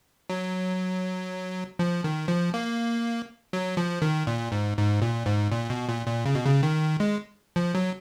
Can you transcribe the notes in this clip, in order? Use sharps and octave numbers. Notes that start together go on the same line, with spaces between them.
F#3
F3
D#3
F3
A#3
F#3
F3
D#3
A#2
G#2
G#2
A#2
G#2
A#2
B2
A#2
A#2
C#3
B2
C#3
D#3
G#3
F3
F#3